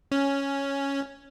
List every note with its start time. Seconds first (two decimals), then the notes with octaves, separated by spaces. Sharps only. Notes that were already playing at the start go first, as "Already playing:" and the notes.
0.12 C#4